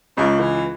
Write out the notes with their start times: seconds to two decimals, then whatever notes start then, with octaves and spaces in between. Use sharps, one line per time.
0.17 C#2 C#3
0.40 E3